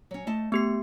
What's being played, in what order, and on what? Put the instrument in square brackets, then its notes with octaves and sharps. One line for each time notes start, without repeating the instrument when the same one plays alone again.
[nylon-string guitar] F#3 C#4
A3 D#5 A5
[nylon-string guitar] A3 [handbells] B3 G4 C7